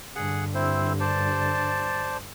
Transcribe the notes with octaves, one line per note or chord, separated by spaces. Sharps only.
G2 D3 G#4 F#5
C4 E4 C5
C5 D5 A5